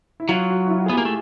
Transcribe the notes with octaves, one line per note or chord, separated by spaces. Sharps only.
E4
F#3 F4
F#4
E4
F4
G#4
B3
G4
A#3
A3